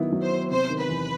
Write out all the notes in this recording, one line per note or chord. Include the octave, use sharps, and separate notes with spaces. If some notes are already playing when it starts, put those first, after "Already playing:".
Already playing: D#3 F#3 B3 E4
F#3
C5
B3
C3 C5
D#3
B4
E2